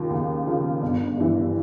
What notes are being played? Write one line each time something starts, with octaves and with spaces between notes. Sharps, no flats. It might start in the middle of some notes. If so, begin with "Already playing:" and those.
Already playing: D#2 C#3 F3
D#2
C#3 F3
G1
G2 E3